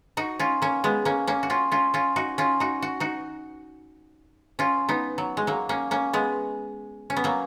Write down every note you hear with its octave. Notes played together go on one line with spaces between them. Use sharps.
D#4 F#4
C#4 F4
A#3 C#4
G#3 B3
A#3 C#4
A#3 C#4
F#4
C#4 F4
C#4 F4
C#4 F4
D#4 F#4
C#4 F4
D#4 F#4
F#4
D#4 F#4
C#4 F4
B3 D#4
F#3
G#3
F#3 A#3
A#3 C#4
A#3 C#4
G#3 B3
C#4
B3
F#3 A#3